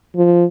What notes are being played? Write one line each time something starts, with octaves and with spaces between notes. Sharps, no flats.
F3